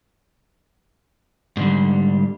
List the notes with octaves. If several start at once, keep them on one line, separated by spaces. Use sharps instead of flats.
G#2 D3 G3